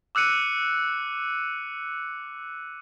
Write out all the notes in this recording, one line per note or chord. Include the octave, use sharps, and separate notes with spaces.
D6 E6 F#6 C#7 D#7